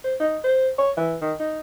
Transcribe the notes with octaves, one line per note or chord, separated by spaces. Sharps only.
C5
D#4
C5
C#5
E3
D#3
D#4